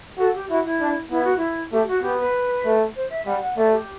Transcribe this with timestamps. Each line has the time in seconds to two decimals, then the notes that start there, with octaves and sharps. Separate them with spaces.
0.18 F#4 A4
0.34 G4
0.49 E4 F#4
0.65 E4
0.80 D4
1.11 B3 E4
1.24 F#4
1.37 E4
1.72 A3 G4
1.88 F#4
2.02 B3 G4
2.19 B4
2.65 A3
2.96 C5
3.10 E5
3.26 G3 F#5
3.41 F#5
3.56 A3 D5
3.72 G4